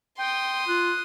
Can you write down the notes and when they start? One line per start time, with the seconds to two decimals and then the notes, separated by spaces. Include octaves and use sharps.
0.18 G5 C6 D#6
0.67 F4 F#6